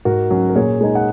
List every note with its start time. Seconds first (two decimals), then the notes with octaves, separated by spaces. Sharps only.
0.05 G#2 F#4 A#4
0.30 F#3 C#4
0.49 A#4
0.56 A#2 G#4 C#5
0.81 G#3 D#4 G#5
0.95 F#5